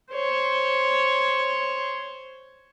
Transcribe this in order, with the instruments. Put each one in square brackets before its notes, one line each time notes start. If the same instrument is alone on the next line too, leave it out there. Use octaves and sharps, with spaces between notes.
[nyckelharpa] C5 C#5